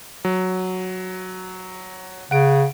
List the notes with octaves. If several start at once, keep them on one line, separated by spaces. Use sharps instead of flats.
F#3
C#3 F#5 D7